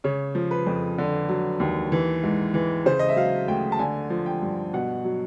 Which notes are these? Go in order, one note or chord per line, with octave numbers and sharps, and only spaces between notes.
C#3 C#5
F3
B4
F2
D3
F#3
D#2
E3
G#2
E3
C#3 C5
D#5
E5
F#3 F5
D2 G5
A5
D3 G#5
F3
G5
G2
B2 F#5
F#3